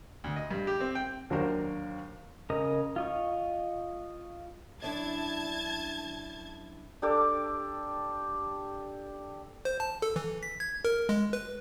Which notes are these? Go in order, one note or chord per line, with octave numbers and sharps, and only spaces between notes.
D2
D#5
G2
G4
C4
G5
D#2 F#3 D4 F#4 A#4 C5
C#3 A#4 D#5 D#6
F4 D#5 C#6
F#2 D4 E4 A5 G#6 A6
D4 G4 A4 D6
C5
A5
A4
E3
B6
G#6
A#4
G#3
B4